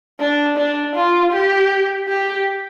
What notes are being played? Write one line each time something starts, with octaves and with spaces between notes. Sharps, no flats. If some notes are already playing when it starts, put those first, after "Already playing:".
D4
D4
F4
G4
G4